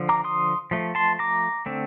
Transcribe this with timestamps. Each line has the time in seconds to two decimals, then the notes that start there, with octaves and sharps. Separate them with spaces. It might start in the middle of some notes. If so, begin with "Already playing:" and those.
Already playing: D3 F3
0.09 A#5 D6
0.24 C6 D#6
0.71 F3 A3
0.95 A5 C6
1.19 A#5 D6
1.66 D3 A3 C4